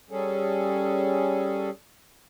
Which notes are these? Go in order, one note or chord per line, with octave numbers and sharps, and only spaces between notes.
G3 C#4 G#4 A4